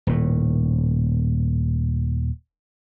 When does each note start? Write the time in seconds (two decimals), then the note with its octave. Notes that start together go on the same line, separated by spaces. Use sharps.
0.07 D#1 A2